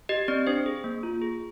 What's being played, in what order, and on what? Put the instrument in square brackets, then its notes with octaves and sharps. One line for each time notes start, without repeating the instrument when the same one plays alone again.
[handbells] G4 D#5
C4 D5
D4 C5
G#4
A#3
F4
G#4